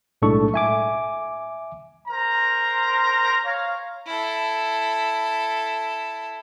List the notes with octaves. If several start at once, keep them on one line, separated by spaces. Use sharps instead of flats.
B1 A2 G#3 D4 A4 C#6
E5 G#5 D6
A#4 C5 A#5
C#5 F5
E4 A4